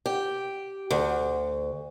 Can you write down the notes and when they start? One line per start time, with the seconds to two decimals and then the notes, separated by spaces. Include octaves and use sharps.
0.06 G4
0.91 D2